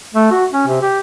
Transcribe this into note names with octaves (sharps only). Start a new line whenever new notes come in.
A3
F#4
C#4
C3
G4